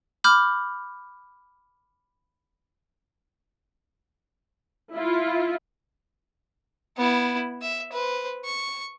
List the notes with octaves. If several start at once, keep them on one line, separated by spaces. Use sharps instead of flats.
B5 D6 F6 G6
E4 F4
B3 E4
E5
B4 C5
C#6